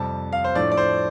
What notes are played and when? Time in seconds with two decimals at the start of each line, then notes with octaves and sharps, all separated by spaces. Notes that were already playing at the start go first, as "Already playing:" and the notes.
Already playing: F2 C3 G3 A5
0.33 F5
0.44 C5
0.55 A2 F3 A3 D4 D5
0.72 D5
0.77 C5